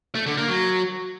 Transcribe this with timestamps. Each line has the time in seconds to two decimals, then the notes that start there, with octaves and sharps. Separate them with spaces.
0.15 A3
0.26 D3
0.37 A#3
0.48 F#3